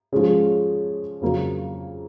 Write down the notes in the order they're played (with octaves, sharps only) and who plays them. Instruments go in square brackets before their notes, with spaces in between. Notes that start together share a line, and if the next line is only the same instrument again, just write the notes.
[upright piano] F3 G#3 C#4 G#4
F2 C#3 F#3 A#3